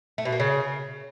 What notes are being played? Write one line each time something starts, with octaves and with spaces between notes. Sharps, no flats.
A3
B2
A#3
C#3